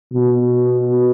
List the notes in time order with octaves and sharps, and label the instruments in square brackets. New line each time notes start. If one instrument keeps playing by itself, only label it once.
[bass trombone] B2